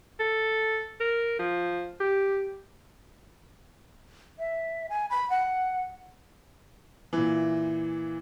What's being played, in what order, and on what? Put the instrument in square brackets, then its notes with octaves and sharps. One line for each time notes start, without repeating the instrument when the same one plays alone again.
[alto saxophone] A4
A#4
F3
G4
[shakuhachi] E5
G#5
B5
F#5
[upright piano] A#2 E3